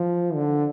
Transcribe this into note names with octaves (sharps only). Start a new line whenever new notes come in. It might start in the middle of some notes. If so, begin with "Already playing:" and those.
Already playing: F3
D3